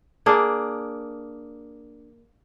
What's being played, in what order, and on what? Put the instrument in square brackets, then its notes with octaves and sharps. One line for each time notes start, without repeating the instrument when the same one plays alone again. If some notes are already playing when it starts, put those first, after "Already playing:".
[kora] A#3 D4 G#4